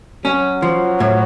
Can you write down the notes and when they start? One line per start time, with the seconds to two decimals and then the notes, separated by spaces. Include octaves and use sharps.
0.25 F#3 C#4
0.62 F3
1.00 A2